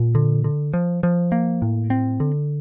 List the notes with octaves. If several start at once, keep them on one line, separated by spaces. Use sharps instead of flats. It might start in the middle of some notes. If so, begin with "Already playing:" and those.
Already playing: A#2
D3
D3
F3
F3
A#3
A2
C4
D3